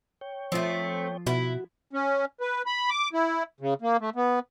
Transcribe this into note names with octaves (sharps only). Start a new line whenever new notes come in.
C#5 G5
F3 A3 C4 F4
B2 E4 F#4
C#4
B4
B5
D6
E4
C#3
A#3
A3
B3